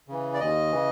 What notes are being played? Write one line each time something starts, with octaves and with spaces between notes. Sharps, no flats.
C#3 E3
D5
D#2 D#5
C#3 E3